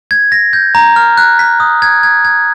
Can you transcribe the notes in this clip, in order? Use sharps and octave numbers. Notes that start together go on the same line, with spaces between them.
G#6
A#6
G6
A#5
F6
F#6
B6
D#6
G#6
G#6
G#6